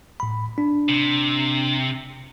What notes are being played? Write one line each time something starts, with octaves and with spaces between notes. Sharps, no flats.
A2 B5
D4
C3